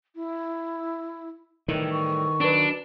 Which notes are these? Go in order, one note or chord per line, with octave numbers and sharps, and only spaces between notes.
E4
A2 D#3 E3 G3
C#6
F#3 D4 B4